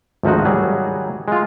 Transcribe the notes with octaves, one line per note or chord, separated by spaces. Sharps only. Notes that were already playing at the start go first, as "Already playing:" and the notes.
G#1 D2 F3 D#4 F#4
D#3 F#3 G3 G#4
G#3 F4